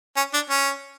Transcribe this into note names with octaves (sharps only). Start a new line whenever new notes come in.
C#4
D4
C#4